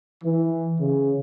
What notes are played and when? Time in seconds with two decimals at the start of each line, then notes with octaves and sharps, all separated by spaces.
0.24 E3
0.78 C#3